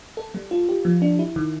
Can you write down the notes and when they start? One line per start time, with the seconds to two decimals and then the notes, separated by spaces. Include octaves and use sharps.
0.17 A4
0.34 G3
0.51 F4
0.69 G4
0.85 F3
1.02 D4
1.19 E4
1.36 D#3